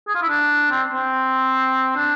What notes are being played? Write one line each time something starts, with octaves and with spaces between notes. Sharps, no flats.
G#4
F4
E4
D4
C4
C4
D4